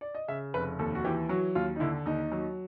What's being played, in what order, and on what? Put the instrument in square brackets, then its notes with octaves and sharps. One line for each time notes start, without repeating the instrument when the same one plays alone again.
[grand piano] D5
D#5
C#3 E5
F1 B4
D#2 A4
F#4
E3 G4
F#3 F#4
D#2 F4
D#4
D3 E4
D#2 D#4
F#3